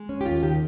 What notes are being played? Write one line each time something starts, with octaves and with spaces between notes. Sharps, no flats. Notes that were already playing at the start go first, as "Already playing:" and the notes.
Already playing: G#3
C#4
G4
D#2 F4
D#3 G4